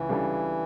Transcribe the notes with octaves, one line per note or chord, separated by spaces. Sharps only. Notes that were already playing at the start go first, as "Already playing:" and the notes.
Already playing: C#2 E3
C#3 G3 D4 A4